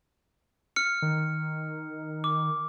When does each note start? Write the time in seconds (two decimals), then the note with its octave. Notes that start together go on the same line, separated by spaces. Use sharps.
0.76 F6 C#7
1.02 D#3
2.24 D6